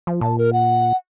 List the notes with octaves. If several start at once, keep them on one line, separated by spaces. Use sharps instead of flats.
F3
A#2 A5
A#4
F#5